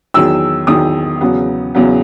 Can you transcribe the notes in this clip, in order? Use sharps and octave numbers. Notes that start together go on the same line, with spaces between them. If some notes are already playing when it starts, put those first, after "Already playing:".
E2 D#3 F#3 E6
E2 D#3 F#3 D#6
E2 C#3 F#3 B3
E2 C#3 F#3 B3